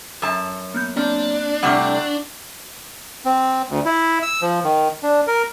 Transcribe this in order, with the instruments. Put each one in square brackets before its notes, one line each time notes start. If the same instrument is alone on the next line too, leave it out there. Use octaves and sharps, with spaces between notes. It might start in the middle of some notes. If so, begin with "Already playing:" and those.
[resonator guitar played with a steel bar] F#2 A5
[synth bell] A#3 B3 G6
[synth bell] A#3 C4 [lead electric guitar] D4
[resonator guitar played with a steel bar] A2 C3 G3 [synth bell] F#5 C#6
[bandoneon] C4
D2
E4
E6
F3
D#3
D4
A#4